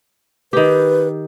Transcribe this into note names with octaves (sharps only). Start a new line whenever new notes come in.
D#3 G4 B4